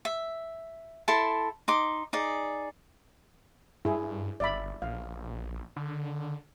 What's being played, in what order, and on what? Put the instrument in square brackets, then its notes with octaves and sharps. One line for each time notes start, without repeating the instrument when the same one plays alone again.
[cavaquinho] E5
E4 A4 A5 C6
D#4 C6 D6
D#4 G#4 D5
[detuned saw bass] G2 [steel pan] E4 G#4
[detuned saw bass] G1 [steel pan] D5 E5 B5
[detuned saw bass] A#1 [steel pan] F5
[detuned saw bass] D3